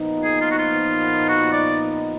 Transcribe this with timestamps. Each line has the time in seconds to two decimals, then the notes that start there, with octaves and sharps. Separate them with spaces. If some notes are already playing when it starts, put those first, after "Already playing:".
Already playing: A#2 F3 B3 D#4
0.24 G#4
0.41 F4
0.51 F#4
0.58 F4
1.29 F#4
1.53 D5